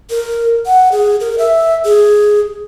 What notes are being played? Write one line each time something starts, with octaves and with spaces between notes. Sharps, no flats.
A#4
F#5
G#4
A#4
E5
G#4